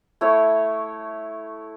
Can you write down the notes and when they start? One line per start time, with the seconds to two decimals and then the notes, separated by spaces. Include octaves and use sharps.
0.21 A3 E4 C#5